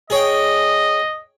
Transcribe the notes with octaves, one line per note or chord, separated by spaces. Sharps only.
G#4 C#5 D#5 G5